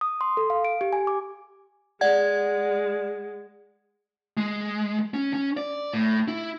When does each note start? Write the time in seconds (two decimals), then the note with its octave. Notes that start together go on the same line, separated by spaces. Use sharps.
0.01 D#6
0.21 C6
0.37 A4
0.50 F5
0.65 D7
0.81 G4
0.93 G#5
1.07 D6
2.01 G#3 D5 F#5 G#6
4.37 G#3
5.14 C#4
5.33 C#4
5.57 D5
5.93 A2
6.28 E4